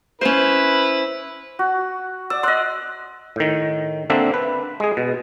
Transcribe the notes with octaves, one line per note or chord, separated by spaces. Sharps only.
C#4 E4 B4 C5
F#4
D5 E6
D5 D#5 C6 E6 F#6
A2 D#3
D3 A#3 C4 D4 E5
B4
G#3 G#4
B2